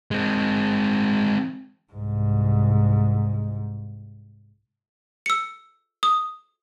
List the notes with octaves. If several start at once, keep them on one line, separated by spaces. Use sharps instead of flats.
G#3 C4
C2 G#2
E6 C#7
D#6